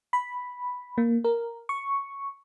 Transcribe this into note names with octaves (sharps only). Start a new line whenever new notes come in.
B5
A#3
A#4
C#6